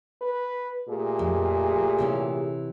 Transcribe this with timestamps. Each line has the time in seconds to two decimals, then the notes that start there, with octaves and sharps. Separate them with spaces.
0.21 B4
0.89 A#2 A3 G4 G#4
1.19 F2
1.98 C3 E3 C#4